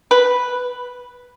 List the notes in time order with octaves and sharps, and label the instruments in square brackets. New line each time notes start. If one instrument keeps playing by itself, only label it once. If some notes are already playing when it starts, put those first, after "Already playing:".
[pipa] B4